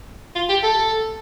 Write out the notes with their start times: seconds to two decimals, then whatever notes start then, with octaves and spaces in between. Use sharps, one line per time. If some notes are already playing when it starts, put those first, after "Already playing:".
0.35 F4
0.49 G4
0.63 A4